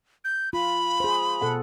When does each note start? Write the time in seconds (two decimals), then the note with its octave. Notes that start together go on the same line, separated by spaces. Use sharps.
0.24 G6
0.53 F4 B5
1.00 G#4 C5
1.41 B2 A4 F#5